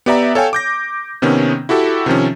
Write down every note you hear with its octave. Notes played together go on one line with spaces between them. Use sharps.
B3 G4 D5 E5 A#5
A4 C#5 F5 G5 G#5
D6 G6 A#6
C3 D#3 B3 C#4
E4 F#4 G4 A4
C3 D#3 F3 C#4